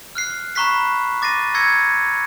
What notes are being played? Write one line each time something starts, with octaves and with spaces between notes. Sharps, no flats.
F6 F#6 C7
A#5 B5 C#6 F#6 B6 C7
D6 A6 A#6 C7 D#7
A#5 C#6 E6 G#6 A#6 C#7